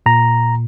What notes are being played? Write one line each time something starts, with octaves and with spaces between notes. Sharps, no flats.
A#2 A#5